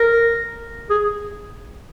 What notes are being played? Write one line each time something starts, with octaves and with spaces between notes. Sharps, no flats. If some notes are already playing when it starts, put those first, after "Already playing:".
Already playing: A#4
G#4